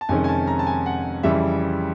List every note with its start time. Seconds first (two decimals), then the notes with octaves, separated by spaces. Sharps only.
0.01 A5
0.09 F2 C3 D#3 G#3 C#4 G#5
0.24 G#5
0.28 A5
0.47 A#5
0.59 A5
0.67 G#5
0.86 F#5
1.23 F2 C#3 E3 G3 E5